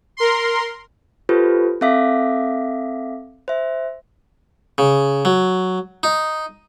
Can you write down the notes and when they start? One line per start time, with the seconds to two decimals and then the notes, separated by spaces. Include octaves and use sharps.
0.17 A#4 C6
1.29 F4 G4 A4 B4 C5
1.81 C4 A4 E5 F5 D6 B6
3.48 C5 E5
4.78 C#3
5.25 F#3
6.03 D#4